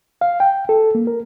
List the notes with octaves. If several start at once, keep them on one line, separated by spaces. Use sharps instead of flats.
F5
G5
A4
A#3
A#4